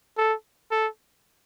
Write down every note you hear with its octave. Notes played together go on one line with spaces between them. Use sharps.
A4
A4